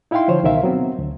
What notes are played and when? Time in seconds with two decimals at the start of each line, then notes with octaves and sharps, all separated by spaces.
0.11 D#4 E4 E5 F5 G5 C6
0.28 D3 F3 C5 C#5
0.43 C#2 B2 D#3 A#4 E5 F5
0.63 F#3 B3 C4
0.99 D2